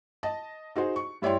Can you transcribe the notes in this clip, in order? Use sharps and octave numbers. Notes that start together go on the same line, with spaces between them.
D#5 A5
D#4 F#4 G#4 C5
C#6
G2 E4 C#5 D5 G5 C6